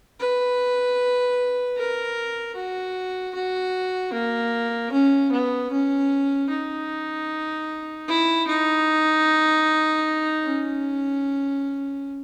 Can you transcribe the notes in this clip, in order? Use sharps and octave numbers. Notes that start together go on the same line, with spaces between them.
B4
A#4
F#4
F#4
A#3
C#4
B3
C#4
D#4
E4
D#4
C#4